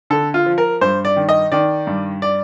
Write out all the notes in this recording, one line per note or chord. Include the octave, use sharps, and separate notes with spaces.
D3 A4
F4
F3
A#4
G2 C5
D5
D#3
D#5
D#3 D5
G2
D5